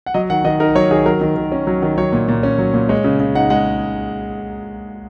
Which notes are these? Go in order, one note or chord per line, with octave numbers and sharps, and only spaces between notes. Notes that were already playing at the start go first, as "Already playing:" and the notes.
F#5
F#3 D#5
D#3 F#5
D#3 D#5
D#4 A#4
F#3 C#5
D#3 G#4
F#3 A#4
D#3
D#3
C#4
F#3
D#3
F#3 C#5
A#2
A#2
C#4
F#3
A#2
G#3 C#5
C#3
C#3
D#4 F#5
G#3 F#5